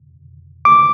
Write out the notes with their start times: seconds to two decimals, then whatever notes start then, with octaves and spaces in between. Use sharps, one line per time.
0.65 D6